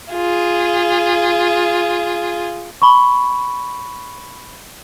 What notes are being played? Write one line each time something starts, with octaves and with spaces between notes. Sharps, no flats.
F4 G#4
B5 C#6